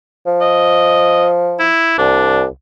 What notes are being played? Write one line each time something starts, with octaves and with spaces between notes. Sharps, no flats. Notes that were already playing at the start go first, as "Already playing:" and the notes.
F3
D#5
E4
C2 D4